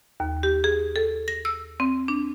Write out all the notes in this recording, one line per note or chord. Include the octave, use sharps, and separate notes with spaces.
D#2
G4
G#4
A4
A#6
E6
C4
D4